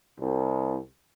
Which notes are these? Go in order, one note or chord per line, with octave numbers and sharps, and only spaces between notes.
C2